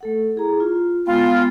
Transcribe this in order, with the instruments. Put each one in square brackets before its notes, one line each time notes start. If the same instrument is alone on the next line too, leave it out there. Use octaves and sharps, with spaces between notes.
[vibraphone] A3 A4 F#5
E4 G#4 A#5
F4
[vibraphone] G#3 B3 G5 [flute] F4